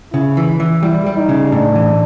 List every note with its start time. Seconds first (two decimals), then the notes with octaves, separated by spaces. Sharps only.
0.14 C#3 E4
0.37 E3
0.60 E3
0.83 G3 E4
1.06 G3
1.17 D#4
1.29 C#3
1.52 A2 D4
1.75 E3